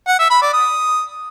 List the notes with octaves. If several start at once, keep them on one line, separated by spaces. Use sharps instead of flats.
F#5
E5
B5
D5
D#6